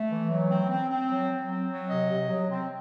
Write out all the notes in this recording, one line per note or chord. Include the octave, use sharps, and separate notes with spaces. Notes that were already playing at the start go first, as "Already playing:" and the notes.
Already playing: A3
E3
F#3
C4
C4
C4
F#3
F#3
C4
F#3
C3 D#5
C3
F#3
C4